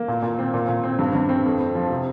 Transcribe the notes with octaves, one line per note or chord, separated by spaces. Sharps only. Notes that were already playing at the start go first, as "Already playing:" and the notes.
Already playing: A#3
A#2
A#2
C4
A#2
A#2
C4
G2
G2
C4
F2
C4
F3
C3